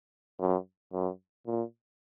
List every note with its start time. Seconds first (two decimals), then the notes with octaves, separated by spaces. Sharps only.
0.40 F#2
0.93 F#2
1.46 A#2